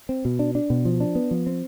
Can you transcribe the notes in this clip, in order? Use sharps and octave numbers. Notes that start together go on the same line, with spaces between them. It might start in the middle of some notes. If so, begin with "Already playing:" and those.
C4
B2
D4
D4
B2
F3
D4
B3
F3
C4